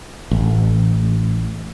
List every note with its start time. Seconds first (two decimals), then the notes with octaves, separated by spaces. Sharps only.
0.31 A1